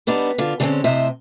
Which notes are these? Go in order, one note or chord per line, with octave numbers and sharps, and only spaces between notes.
G3 B3 D4 D#4
D3 F4
D3 G3 G#3 A#3 C4 C#4
A2 C3 C5 D#5 E5